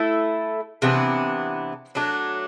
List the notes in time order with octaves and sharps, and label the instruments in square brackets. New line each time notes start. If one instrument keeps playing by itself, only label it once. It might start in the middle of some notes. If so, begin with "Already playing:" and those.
Already playing: [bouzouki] A3 E4 A4
C3 E3 B3 D4
F#3 A3 D4